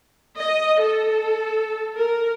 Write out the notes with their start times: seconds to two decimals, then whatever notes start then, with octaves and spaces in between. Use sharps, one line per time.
0.38 D#5
0.79 A4
1.96 A#4